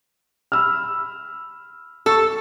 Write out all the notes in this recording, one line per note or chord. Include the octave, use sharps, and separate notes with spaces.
B5 E6 F6
A4 C#6 E6